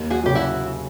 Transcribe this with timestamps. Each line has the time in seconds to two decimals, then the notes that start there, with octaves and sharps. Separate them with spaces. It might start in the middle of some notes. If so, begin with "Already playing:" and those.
Already playing: D#2
0.10 F#4 G#4
0.23 C#3 F#3 G4
0.35 E4 F#4